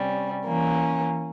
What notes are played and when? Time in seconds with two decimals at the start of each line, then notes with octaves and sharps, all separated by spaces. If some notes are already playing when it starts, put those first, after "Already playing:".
Already playing: C3 G3 C#4
0.44 E3 A#3 C#4